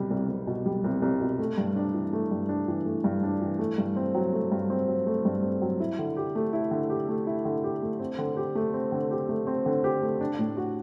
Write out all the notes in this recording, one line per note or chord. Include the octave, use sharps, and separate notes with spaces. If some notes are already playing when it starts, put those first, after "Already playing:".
Already playing: C2 B2 G3
C2
C2
B2
G3
C2
C2
B2
A3
G2
D4
E3
A3
G2
D4
E3
A3
G2
D4
E3
A3
G2
C4
F#3
A3
G2
C4
F#3
A3
G2
C4
F#3
E4
D3
G4
A3
E4
D3
G4
A3
E4
D3
G4
A3
C4
D3
G4
A3
C4
D3
G4
A3
C4
D3
G4
A3
D4
A2
F#4